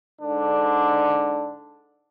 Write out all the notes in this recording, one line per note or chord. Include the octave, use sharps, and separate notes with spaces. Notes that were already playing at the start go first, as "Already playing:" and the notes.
G#2 D3 D4